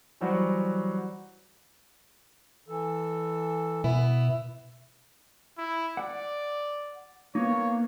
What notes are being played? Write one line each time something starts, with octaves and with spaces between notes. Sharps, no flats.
E3 F#3 G3 F#4 C5
E3 A4
B2 B3 E4
E4
D5 F#5
A#3 B3 D#4 C#5